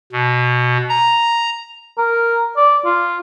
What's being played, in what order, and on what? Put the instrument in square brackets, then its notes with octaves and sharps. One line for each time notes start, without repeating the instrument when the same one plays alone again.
[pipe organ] B2
A#5
[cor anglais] A#4
D5
F4